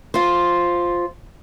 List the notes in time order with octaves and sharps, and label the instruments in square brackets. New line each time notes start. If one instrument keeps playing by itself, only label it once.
[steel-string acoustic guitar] F4 C5